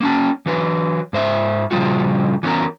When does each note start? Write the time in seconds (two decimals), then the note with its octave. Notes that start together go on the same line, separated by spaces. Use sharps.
0.01 A#3 C#4 A5
0.46 E3 F#3 B4
1.13 G#2 C5 E5
1.71 A#2 C#3 F3 G3 F4 F#4
2.43 E3 B3 C#4 F#4 A#4